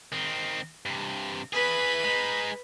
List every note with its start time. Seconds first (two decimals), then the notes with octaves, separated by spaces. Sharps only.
0.12 D#3 C4
0.86 G2 C3
1.53 E3 G#4 B4 B5
2.03 G#3 D#4